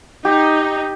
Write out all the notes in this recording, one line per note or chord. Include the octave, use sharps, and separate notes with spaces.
D#4 G4